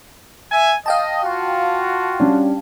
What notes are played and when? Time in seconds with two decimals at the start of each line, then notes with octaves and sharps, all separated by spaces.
0.51 E5 G#5
0.86 D#5 F5 G5 A5
1.22 F4 F#4
2.20 G3 C#4 D4